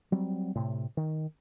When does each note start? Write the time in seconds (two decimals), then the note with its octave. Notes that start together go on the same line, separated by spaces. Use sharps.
0.12 F#3 G3 C4
0.55 A2 C3
0.97 D#3